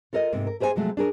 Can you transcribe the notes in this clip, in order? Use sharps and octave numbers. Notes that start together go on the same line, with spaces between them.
F4 A4 A#4 D5 D#5
G#2 C3 A#3
A#4
G4 G#4 C5 D5 G#5
C3 F3 F#3 G#3 A3
D4 G#4 A#4